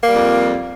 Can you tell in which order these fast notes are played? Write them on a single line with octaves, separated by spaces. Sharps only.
A#3 G3 F2